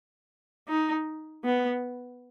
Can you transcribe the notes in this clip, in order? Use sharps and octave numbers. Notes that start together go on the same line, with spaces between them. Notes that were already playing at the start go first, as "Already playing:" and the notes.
D#4
B3